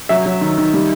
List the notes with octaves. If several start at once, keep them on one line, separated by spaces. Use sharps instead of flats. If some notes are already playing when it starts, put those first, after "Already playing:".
F#3 E5
F#3
D#3
D#3
G3